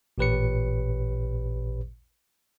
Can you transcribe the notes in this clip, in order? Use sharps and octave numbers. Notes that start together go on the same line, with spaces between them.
A1 A#2 G4 B4 C#5 C#7